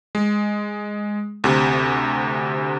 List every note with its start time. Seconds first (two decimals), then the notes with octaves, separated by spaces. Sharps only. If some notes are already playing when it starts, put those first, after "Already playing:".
0.15 G#3
1.44 D2 C3